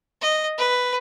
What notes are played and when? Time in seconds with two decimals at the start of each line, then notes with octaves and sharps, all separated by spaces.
0.21 D#5
0.58 B4